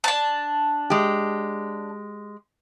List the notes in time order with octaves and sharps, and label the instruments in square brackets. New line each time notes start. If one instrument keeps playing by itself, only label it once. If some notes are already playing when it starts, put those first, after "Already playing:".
[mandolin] D4 A5
[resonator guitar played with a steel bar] G#3 G4